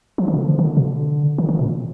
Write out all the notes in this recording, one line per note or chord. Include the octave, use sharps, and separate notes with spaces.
F3
D#3
B2
D3
F3
D#3
D3
B2
D3
D#3
D#3
A#2